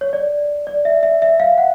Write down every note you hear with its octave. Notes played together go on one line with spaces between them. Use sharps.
C#5
D5
D5
E5
E5
E5
F5
F#5